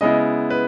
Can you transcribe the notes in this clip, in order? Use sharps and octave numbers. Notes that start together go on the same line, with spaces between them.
C#3 G#3 B3 E4 D#5
B4